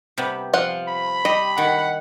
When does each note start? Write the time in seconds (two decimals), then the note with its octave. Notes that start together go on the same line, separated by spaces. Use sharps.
0.18 C3 G3 B3
0.54 F3 F4 F#5
0.88 B5
1.25 G3 D#5
1.58 D#3 F#5